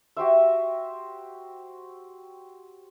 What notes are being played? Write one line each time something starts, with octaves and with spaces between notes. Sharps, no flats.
F#4 G4 C5 E5